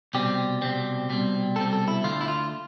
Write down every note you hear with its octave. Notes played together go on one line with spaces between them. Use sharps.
C2 B2 G3 C4 G4
C2 B2 G3 C4
C2 B2 G3 C4
C2 B2 G3 C4 A4
A4
E4
D2 D3 A3 F4
E4
F4